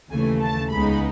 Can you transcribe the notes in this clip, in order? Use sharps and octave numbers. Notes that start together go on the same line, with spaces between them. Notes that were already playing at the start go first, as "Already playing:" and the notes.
D#2 C#3 E3 A3 G#5
A5
C#2 C#3 G#3 B3 D#4 B5